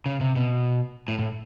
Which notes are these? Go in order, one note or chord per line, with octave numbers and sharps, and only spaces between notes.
C#3
C3
B2
A2
A2